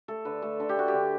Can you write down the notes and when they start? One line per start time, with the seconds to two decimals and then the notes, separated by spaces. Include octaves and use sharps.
0.08 A3 A4
0.25 D3 B4
0.42 A3 A4
0.60 D3 A4
0.69 G4
0.76 A3 F#4
0.88 G4
0.94 D3